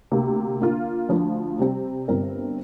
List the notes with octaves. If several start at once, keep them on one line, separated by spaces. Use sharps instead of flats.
D2 C3 A#3
D3 A#3 F4
D2 D3 F3
C3 G3 C4
G1 G2 G3 C4 A#4